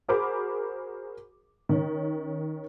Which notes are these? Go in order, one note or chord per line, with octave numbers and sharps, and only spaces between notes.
F#4 G#4 A#4 C5 B5 D6
D#3 C#4